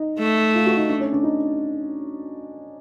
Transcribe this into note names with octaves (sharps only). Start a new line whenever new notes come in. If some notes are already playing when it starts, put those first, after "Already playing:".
Already playing: D#4
A3
F4
F#4
D#4
D4
C#4
D4
D#4